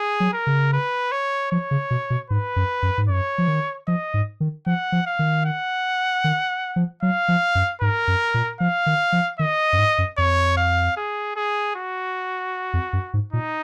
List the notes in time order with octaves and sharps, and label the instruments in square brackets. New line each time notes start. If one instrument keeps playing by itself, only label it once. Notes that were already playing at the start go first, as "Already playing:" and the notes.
Already playing: [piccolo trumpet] G#4
[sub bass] F#3
[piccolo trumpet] A#4
[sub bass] C#3
[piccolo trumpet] B4
C#5
[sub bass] F3 [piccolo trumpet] C#5
[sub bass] C#3
B2
B2
[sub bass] G#2 [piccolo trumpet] B4
[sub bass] F#2
F#2
G#2
[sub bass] F#2 [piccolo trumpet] C#5
[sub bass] F3
D#3
[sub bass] F3 [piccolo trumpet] D#5
[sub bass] G#2
D#3
[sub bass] F3 [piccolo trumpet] F#5
[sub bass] F3
[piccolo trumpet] F5
[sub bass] D#3
[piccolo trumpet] F#5
[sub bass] D#3
F3
[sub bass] F#3 [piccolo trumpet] F5
[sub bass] F3
F#2
[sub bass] G#2 [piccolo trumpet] A#4
[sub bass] F#2
A#2
[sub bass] F3 [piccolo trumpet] F5
[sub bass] D#3
F3
[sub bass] D#3 [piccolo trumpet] D#5
[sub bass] F#2
G#2
F#2
[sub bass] F2 [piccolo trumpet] C#5
[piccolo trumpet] F5
G#4
G#4
F#4
[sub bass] F2
F#2
G#2
[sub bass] A#2 [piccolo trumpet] D#4